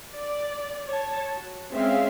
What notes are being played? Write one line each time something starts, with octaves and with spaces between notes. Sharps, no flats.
D5
C#5 A5
F#4
G#3 C4 C#4 E5 F5